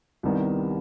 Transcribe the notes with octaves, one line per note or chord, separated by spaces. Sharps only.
C2 C3 D#3 G3 B3